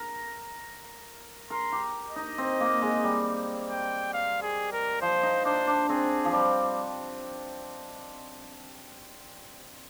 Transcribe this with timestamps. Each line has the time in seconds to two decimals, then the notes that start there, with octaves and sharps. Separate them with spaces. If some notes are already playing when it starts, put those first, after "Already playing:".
Already playing: A#4
1.50 A#4 C6
1.72 G4
2.09 D#5
2.16 D#4
2.38 C4
2.60 A#3
2.82 G#3
3.04 G3
3.69 G5
4.13 F5
4.42 G#4
4.72 A#4
5.01 F3 C5
5.23 D#4
5.45 D4 C5
5.67 D4
5.89 C4 G#4
6.25 F3
6.33 G3